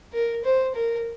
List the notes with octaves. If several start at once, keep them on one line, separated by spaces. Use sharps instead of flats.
A#4
C5
A#4